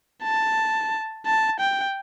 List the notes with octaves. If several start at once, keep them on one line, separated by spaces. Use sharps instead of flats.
A5
A5
G5